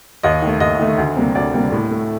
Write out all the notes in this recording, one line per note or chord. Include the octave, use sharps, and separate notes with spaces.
D#2 D#5
D#3 A3
D#2 D#5
D#3 A3
D2
C3 G3 A#3
D2 D5
C3 G3 A#3
A2
A3